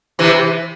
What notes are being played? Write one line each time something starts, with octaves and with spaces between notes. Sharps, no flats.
C3 E3